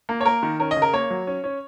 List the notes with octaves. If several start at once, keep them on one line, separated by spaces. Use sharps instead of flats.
A#3
C#5
A#3 A#4
D#3
C#4 A#4
D#5
C#3
A#4
A#3 C#5
F#3
C#4
C#4